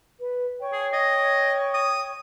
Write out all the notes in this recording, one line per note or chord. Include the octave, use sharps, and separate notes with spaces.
B4
C#5 G5 C#6
G#4
D#5
D#6